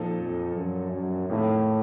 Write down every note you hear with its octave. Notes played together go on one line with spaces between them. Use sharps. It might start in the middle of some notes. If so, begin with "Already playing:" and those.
Already playing: A#2 F3 C4 D#4 A4
F2
F#2
F#2
F2 A2 D#3 A#3